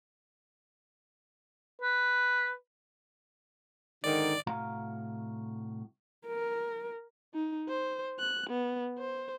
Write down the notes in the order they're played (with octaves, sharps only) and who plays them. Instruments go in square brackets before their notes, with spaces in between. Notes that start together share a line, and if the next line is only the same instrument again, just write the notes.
[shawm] B4
[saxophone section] G#2 D3 D#3 [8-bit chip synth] D5
[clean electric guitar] C2 A2 F#4 F5 A#5
[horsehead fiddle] A#4
[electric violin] D#4
C5
F#6
B3
C5